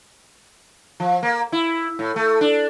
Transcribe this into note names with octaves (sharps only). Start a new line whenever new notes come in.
F3
A#3
E4
A2
A3
D4